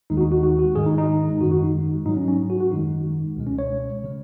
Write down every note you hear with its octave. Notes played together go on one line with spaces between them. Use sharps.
D#2 D#3 G#3 D#4
F#4
D#4
F#4
F#4
F#4
G#2 D#3 G#3 G#4
D#4
D#4
F#2 D#3 G#3 F#4
F#4
D#4
G#2 F#3 D#4
C#4
C#4
F#4
F#4
F#2 D#3 G#3 D#4
C#2 B2 G#3
C#4
C#5
C#3 G#3